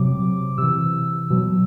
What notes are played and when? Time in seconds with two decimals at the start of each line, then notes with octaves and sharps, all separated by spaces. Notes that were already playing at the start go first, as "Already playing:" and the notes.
Already playing: C3 F#3 D6
0.58 C3 E3 E6
1.30 B2 F#3